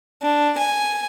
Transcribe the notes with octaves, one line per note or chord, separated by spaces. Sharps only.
D4
G#5